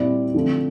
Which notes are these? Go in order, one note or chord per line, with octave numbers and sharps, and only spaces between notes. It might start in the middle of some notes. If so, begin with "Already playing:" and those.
Already playing: A#2 G3 C4 E4 D5
D3 F3 A3 C4